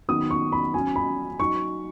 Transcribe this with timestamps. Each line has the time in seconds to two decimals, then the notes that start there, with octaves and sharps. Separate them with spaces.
0.08 D#3 F#3 B3 D#4 D#6
0.30 C#6
0.52 B5
0.74 F#3 C#4 G#5
0.96 B5
1.40 F#3 D#4 C#6